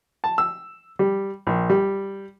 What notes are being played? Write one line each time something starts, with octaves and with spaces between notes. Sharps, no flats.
A5
E6
G3
A#1
G3